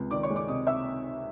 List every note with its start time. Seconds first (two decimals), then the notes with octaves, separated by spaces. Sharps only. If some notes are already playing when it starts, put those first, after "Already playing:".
Already playing: C#2 C3
0.11 D#3 D5 D6
0.23 C#5 C#6
0.30 G#3
0.36 D5 D6
0.48 C3 D#5 D#6
0.67 E5 E6